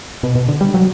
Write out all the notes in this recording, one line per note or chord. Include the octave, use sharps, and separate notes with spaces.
B2
B2
D3
G3
F#3